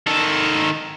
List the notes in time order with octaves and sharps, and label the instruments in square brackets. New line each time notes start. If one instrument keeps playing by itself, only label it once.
[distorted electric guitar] D#3 A4